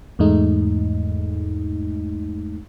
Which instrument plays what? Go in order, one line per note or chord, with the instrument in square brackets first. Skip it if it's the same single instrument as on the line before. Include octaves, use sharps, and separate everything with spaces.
[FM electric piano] E2 G#2 G#3 A3 D#4